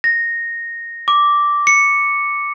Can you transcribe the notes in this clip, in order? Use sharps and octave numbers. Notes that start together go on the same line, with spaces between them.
A#6
D6
C#7